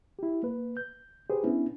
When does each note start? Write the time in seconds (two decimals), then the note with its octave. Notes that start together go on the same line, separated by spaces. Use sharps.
0.19 E4 G4
0.43 A#3 B4
0.77 G6
1.30 G4 G#4 B4 C5
1.44 B3 C#4 D4 E4